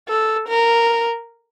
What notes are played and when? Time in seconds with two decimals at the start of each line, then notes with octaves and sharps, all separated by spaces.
0.09 A4
0.48 A#4